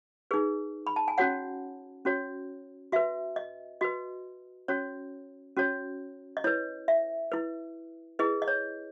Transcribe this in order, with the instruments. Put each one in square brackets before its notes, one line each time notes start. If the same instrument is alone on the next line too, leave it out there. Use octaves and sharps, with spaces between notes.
[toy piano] D#4 G#4 B4
B5
A5
G#5
C#4 F#4 C#5 F#5
C#4 F#4 C#5
F#4 B4 E5
D#5
F#4 B4 D#5
C#4 F#4 C#5
C#4 F#4 C#5
D#5
E4 B4 C#5
E5
E4 B4
E4 G#4 B4 D#5
D#5
C#5